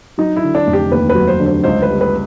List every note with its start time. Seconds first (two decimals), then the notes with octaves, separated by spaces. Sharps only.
0.18 F#3 D#4
0.36 E4
0.43 D3
0.55 D4
0.67 F1
0.73 G4
0.91 D#2 B4
1.09 B4
1.15 F#3
1.27 C5
1.40 D3
1.46 C5
1.64 C#2 C5
1.82 B4
1.88 G3
2.01 B4